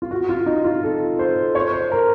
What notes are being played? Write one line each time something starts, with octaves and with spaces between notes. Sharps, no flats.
F4
F#4
F4
D#4
F4
A4
C5
C#5
C5
A#4